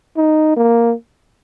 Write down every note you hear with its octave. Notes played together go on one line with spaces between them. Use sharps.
D#4
A#3